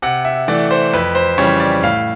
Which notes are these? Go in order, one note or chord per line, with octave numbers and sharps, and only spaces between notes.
C3 F#5
E5
E3 A3 D5
C5
F2 B4
C5
C#3 E3 G3 C#5
D5
A2 F5